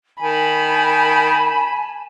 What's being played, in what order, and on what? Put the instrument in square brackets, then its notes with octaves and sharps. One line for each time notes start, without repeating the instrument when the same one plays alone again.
[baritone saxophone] D#3 [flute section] G#5 A5 [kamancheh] B5